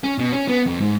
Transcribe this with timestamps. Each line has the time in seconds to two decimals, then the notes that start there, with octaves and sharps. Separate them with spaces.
0.04 C#4
0.18 B2
0.32 C#4
0.48 B3
0.66 F2
0.81 G#2